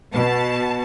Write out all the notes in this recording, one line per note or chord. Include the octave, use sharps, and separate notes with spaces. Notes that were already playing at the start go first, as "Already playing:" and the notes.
B2 A5